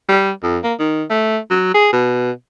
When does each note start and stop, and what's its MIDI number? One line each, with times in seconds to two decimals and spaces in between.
0.09 0.30 55
0.43 0.58 41
0.64 0.74 58
0.79 1.03 51
1.10 1.38 57
1.51 1.71 54
1.74 1.91 68
1.93 2.31 47